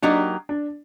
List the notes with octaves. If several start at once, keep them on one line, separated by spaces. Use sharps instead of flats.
F#3 A#3 D4 D#4 G4
D4